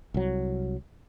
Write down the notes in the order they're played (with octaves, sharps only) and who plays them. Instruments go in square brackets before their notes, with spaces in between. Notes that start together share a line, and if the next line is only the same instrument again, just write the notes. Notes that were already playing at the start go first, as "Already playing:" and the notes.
[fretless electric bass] C2 F#3